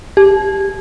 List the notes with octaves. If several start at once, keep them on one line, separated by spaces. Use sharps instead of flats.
G4